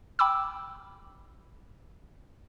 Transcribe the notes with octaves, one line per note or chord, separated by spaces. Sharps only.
G5 B5 D6 E6